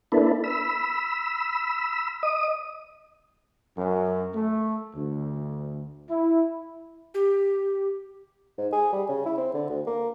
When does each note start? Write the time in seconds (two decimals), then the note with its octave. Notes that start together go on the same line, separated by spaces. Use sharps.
0.12 A#3 D4 E4 A4 B4
0.44 B5 E6
2.23 D#5 D#6
3.78 F#2
4.34 A3
4.95 D2
6.10 E4
7.14 G4
8.58 G#2
8.72 G#4
8.93 G3
9.09 C#3
9.25 E4
9.38 C4
9.54 D3
9.69 D2
9.87 A#3